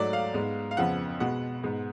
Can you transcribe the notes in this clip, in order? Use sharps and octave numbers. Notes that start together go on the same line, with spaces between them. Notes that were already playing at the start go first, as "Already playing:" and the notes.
Already playing: G#2 F#3 A3 D5
F5
G#2 G#3 B3
F5
F2 C#3 F3 B3 F#5
B2 G#3 B3 F#5
G#2 G#3 B3